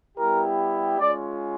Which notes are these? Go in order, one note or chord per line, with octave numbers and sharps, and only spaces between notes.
G3 B3 E4 G4 A#4
G#3 C#4 F4 D5